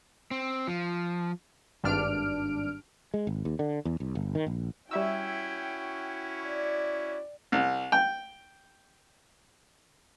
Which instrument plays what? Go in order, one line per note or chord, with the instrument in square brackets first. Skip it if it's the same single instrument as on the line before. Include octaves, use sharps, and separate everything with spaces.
[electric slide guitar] C4
F3
[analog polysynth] G#1 G2 D4 F6 D7
[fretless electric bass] G#3
G#1
D#2
D3
E2
C2
G1
D#3
A#1
[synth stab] G3 E5 E6 [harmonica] C#4 E4 F#4 [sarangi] G5
[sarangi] D5
[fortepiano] C2
G5